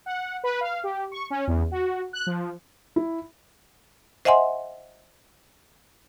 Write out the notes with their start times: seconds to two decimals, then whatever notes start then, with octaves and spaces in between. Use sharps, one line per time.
0.06 F#5
0.44 B4
0.61 F5
0.84 G4
1.12 C#6
1.30 C#4
1.47 E2
1.71 F#4
2.13 F#6
2.27 F3
2.96 E4
4.25 C5 D#5 E5 F#5 G#5 C6